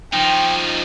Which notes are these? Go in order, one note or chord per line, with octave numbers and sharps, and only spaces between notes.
F3 D#4 G5